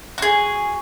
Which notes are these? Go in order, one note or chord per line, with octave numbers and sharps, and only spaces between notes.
F#4 G#4